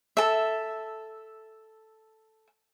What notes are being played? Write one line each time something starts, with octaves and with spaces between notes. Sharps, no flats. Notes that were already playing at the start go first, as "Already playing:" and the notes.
A4 E5